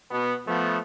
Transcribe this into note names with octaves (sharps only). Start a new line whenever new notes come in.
B2 B3
F3 A3 B3